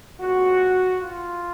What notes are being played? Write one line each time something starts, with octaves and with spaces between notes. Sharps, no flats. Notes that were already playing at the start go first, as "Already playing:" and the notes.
A#2 G#3 C4 F#4
F4